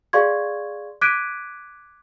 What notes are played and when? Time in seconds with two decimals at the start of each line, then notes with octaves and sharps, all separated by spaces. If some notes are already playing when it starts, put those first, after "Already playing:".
0.13 G#4 D5 F5 C6 C#6 G#6
1.01 D6 F#6 G#6 B6 D7 D#7